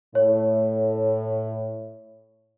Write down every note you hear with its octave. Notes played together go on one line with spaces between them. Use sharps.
A2 C#5